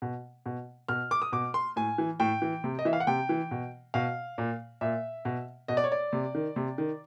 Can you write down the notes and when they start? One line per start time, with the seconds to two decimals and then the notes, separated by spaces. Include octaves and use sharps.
0.02 B2
0.46 B2
0.89 B2 F6
1.11 D6
1.22 D#6
1.32 B2 D6
1.54 C6
1.76 A2 G#5
1.98 E3
2.20 A2 G5
2.42 E3
2.64 C3
2.79 D#5
2.85 E3 E5
2.93 F5
3.00 F#5
3.07 C3 G5
3.29 E3
3.51 B2
3.94 B2 F5
4.38 A#2
4.81 A#2 E5
5.25 B2
5.68 B2 D#5
5.77 D5
5.84 C#5
5.92 D5
6.13 C3
6.35 D#3
6.56 C3
6.78 D#3